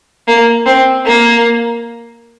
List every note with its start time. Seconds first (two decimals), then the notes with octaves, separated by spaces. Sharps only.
0.28 A#3
0.66 C4
1.06 A#3